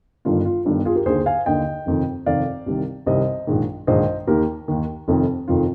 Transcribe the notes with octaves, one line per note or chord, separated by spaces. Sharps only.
G1 G2 D#3 F4
F4
G1 G2 D#3
F4 G#4
G4 A#4
D#2 D3 G#4 C5
F5 G#5
D#2 D3 D#5 G5
F1 F2 D#3
F1 F2 D#3 D5 F5
C2 C3 D#3
C2 C3 D#3 C5 D#5
A#1 G#2 D#3
A#1 G#2 D#3 C5 D#5
D#2 D#3 G4 A#4
D#2 D#3
F1 F2 D#3
F1 F2 D#3 F4